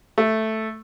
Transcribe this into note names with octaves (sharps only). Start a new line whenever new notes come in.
A3